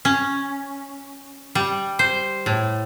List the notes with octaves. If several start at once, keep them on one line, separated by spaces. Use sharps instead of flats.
C#4
G3
C5
A2